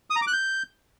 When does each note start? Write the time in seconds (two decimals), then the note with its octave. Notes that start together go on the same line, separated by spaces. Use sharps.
0.10 D#6
0.16 A#5
0.22 D6
0.27 F#6
0.33 G6